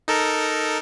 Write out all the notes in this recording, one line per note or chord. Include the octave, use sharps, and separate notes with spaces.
D#4 A4 A#4